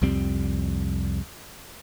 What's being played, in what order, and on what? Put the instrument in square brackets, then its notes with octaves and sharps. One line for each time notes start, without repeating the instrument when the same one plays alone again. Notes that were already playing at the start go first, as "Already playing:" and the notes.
[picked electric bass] C2 F2 G3 C4